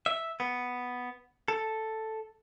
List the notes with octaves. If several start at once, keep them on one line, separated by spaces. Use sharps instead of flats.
E5
B3
A4